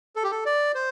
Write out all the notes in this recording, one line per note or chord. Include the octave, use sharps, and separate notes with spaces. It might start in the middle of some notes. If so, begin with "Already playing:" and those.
A4
G4
A4
D5
C5